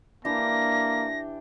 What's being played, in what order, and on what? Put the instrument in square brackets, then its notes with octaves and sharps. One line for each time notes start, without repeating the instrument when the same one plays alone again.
[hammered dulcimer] E3 D4 G4 [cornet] A#3 [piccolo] A#6